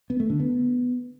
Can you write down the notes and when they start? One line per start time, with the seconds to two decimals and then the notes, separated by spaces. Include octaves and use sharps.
0.10 B3
0.20 A3
0.30 D3
0.40 B3